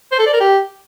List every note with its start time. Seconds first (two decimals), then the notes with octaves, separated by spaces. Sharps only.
0.12 C5
0.19 A4
0.26 D5
0.33 A#4
0.40 G4